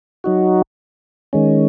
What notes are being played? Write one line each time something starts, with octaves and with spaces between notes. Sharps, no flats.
F#3 D#4 F#4
D#3 G#3 C#4